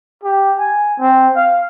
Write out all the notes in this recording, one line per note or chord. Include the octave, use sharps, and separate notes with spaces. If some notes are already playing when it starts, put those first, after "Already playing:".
G4
G#5
C4
F5